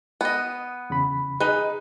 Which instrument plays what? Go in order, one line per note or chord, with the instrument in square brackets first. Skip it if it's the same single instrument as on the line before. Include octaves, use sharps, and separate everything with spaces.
[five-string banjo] B3 D#5
[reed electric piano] E2 C#3 B5
[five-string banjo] D#4 B4 [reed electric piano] G#4 D#5